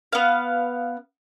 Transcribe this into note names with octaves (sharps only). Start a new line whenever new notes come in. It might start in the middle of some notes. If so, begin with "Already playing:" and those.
B3 F5